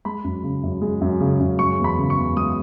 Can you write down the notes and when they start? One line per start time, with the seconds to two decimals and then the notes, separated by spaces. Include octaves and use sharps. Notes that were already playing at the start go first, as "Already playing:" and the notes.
0.05 G#3 B5
0.24 F#2
0.43 C#3
0.63 F#2
0.81 G#3
1.01 F#2
1.20 C#3
1.40 F#2
1.59 G#3 C#6
1.79 E2
1.84 B5
1.98 C#3
2.10 C#6
2.17 E2
2.36 G#3 D#6